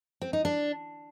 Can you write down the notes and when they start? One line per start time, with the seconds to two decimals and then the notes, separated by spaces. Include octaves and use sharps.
0.22 C4
0.33 D#4
0.45 D4